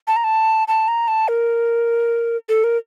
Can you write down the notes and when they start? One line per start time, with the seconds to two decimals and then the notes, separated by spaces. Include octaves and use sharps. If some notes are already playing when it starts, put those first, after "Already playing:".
0.07 A5
0.16 A#5
0.24 A5
0.68 A5
0.88 A#5
1.08 A5
1.28 A#4
2.49 A4
2.64 A#4